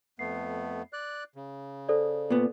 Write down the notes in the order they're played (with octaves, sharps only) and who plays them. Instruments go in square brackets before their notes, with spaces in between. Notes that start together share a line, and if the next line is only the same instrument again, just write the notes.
[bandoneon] F2 A3 B3 [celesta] C7
[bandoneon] D5 F#6
C#3
[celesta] A4 C5 D5
[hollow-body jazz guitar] A#2 B3